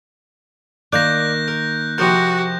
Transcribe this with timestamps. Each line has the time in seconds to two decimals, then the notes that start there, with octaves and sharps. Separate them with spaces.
0.93 D#3 A#3 D5 F5 F#6 G6 A#6
1.48 A#4
1.98 C3 F3 F#4 A#4 G6